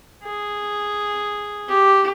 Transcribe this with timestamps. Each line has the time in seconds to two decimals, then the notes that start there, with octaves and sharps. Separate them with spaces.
0.23 G#4
1.68 G4